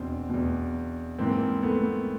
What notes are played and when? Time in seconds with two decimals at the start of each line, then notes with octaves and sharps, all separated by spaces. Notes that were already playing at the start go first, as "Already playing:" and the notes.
Already playing: E2 B2 C4 D4
0.29 E2 B2
1.18 G#2 E3 A#3 C4
1.63 A3 B3